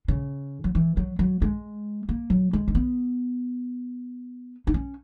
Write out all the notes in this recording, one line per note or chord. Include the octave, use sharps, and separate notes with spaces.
C#3
F#3
E3
F#3
F#3
G#3
A#3
F#3
G#3
C#4
B3
D#4
C#4